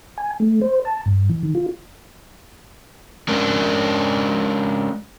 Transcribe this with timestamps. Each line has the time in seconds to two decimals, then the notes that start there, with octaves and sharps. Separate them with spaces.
0.18 G#5
0.40 A3
0.61 C5
0.85 A5
1.06 G2
1.30 E3
1.43 D#3
1.55 F4
3.28 G#3 C#4 D4 A#4